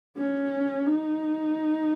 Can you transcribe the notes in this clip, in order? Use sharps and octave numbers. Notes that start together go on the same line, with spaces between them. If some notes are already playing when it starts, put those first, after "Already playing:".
C#4
D#4